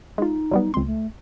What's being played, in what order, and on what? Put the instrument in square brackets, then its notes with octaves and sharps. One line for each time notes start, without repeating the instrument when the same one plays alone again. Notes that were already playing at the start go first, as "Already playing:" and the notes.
[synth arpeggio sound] G#3 F4 [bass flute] D#4
[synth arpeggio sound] F#3 G3 B3
[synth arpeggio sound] C#2 C6 [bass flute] C4
[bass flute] A3